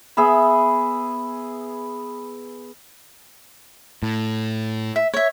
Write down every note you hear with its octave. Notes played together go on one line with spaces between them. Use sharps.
B3 G#4 E5 B5
A2
E5
C#5 E5